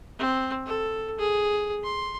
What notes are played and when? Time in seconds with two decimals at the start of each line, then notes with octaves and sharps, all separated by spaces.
0.19 C4
0.66 A4
1.19 G#4
1.83 C6